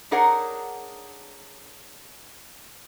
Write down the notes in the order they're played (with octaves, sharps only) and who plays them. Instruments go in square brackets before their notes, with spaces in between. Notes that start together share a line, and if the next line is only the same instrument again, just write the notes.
[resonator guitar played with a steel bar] D4 D#4 G#4 A#4 C#5 F#5